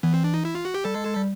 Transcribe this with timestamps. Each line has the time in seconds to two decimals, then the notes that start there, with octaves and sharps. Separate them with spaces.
0.03 E3 B3
0.14 C4
0.24 D4
0.34 D#4
0.45 E4
0.55 F4
0.65 F#4
0.74 G4
0.85 G3 A4
0.95 G#3
1.06 G#3
1.16 G3